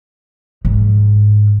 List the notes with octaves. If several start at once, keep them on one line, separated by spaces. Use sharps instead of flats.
G#2